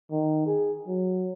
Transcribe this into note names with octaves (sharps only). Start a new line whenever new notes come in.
D#3
G#4
F#3